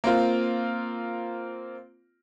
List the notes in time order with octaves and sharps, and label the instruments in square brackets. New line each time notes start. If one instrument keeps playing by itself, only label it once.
[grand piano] A#3 C4 F4